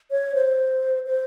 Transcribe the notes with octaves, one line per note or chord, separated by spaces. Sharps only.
C#5
C5
C5